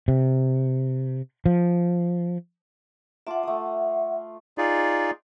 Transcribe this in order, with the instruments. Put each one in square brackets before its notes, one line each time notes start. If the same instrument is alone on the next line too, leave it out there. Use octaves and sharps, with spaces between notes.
[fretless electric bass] C3
F3
[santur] F4 A5 D6 [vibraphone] E5 F#5
[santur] A3 D#6
[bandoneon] D#4 F4 G#4 D5